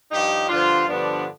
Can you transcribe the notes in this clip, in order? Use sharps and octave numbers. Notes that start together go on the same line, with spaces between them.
G2 F3 D#4 G4
G2 D3 F3 D4 F4
G2 D3 F3 B3 D4